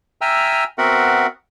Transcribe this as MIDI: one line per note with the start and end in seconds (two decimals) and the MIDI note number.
0.21 0.64 76
0.21 0.64 79
0.21 0.64 80
0.21 0.64 82
0.21 0.64 88
0.21 0.64 89
0.78 1.27 59
0.78 1.27 60
0.78 1.27 66
0.78 1.27 70
0.78 1.27 76
0.78 1.27 78